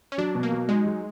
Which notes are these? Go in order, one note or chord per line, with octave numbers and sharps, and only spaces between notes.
C#4
F#3 D4
B2
A#3
F#3
G#3 D#4
F#3